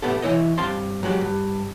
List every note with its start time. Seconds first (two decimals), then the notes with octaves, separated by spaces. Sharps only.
0.02 A2 A3 B3 G4 A4
0.22 E3 F3 E4 C#5 D#5
0.58 G2 C4 F5 A5 C6
1.03 F#3 G#3 F#4 G4
1.21 G2